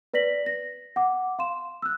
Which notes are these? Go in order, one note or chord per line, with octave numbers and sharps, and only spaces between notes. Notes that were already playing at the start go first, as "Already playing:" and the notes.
B4 D5 A#6 B6 F#7
A#6
F#5 D6
F5 C6 E7
E6 F#6